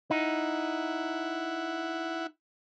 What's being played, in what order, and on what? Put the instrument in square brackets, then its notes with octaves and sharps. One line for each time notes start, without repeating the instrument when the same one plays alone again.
[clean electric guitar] D#4 [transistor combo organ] E4 F#5